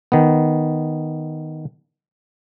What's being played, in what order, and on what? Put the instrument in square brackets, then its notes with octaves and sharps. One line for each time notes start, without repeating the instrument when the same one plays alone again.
[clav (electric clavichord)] D#3 B3